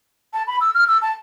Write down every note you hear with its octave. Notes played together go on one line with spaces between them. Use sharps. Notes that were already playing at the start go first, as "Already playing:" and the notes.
A5
B5
E6
F6
E6
A5